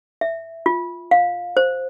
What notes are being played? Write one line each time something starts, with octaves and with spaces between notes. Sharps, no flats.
E5
F4
F5
C5